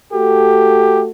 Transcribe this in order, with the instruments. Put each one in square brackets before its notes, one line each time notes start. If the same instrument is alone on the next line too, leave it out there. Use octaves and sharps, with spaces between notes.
[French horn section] A3 F#4 A4 [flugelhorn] G4